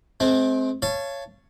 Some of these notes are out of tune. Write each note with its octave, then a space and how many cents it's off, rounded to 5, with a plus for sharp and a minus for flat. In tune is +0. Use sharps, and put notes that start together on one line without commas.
G#3 +45 C4 +0
C#5 +0 F5 -35 A5 +0